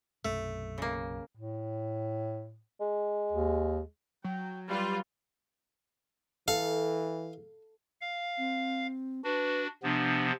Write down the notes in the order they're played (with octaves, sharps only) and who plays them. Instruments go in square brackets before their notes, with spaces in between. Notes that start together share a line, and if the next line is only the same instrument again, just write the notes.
[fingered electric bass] B1 F#2 C3 [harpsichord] A3
[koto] C#3 A#3
[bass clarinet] A2
[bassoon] G#3
[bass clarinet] D#2
[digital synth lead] F#3 [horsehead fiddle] G5
[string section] G3 F4 [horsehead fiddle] B4 F5
[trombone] E3 [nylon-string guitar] A4 [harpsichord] F5
[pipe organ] F5
[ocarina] C4
[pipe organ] D4 F#4 [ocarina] B4
[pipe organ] C3 F3 B3 [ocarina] D4